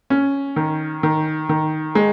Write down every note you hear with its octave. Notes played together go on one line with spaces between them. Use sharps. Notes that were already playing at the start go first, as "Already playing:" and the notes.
C#4
D#3
D#3
D#3
G#3